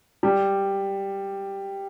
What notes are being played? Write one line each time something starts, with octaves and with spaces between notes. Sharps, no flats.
G3